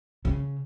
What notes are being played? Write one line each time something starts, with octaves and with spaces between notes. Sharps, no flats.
C#3